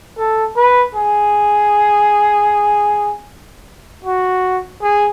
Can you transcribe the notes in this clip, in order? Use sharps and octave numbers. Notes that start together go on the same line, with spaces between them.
A4
B4
G#4
F#4
G#4